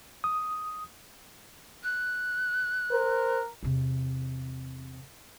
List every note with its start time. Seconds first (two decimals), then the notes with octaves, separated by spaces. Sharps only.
0.24 D#6
1.84 F#6
2.92 A#4 C5
3.63 E2 C3